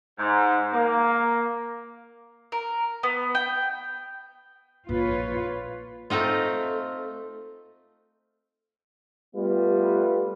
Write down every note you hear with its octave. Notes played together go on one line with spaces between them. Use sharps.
G#2
A#3
A#4
B3
G5
A#1 E4 F4 B4 C#5
A3 C4 D#4 F4
G3 A3 B3 F4 B4